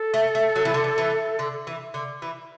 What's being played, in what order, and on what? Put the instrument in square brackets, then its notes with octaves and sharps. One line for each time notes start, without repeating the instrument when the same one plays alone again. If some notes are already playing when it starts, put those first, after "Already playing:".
Already playing: [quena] A4
[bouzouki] A3
A3
F#3
E3
D3
E3
E3
D3
E3
D3
E3